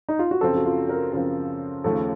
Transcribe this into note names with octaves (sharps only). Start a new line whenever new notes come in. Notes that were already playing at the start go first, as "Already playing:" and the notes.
D#4
F4
F#4
F#2 C#3 F3 C4 A4
F#4
F4
A#4
F#2 C#3 F3 C4 A#4
D#2 C#3 F3 A3 A4